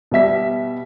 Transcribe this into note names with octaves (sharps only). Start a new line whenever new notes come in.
B2 G3 E5 B6